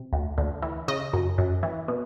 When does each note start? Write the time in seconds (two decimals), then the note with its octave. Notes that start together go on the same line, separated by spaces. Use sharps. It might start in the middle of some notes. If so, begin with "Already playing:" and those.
Already playing: C3
0.13 D2
0.38 D2
0.62 E3
0.88 C#3 D#5
1.13 F#2
1.38 F#2
1.63 E3
1.88 B2